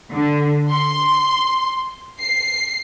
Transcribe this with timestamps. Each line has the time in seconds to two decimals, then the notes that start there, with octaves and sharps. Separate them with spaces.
0.13 D3
0.70 C6
2.21 C7